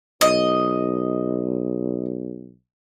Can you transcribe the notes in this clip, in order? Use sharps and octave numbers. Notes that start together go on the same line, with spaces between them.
B1 D#5